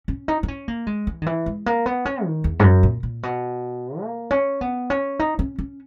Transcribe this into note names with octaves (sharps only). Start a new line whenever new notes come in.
C#4
D#4
D#4
C#4
A#3
G#3
E3
D#3
E3
G#3
A#3
B3
C#4
D#3
E2
G#2
F#2
A#2
A#2
B2
A#3
C#4
B3
C#4
D#4
C#4
C#4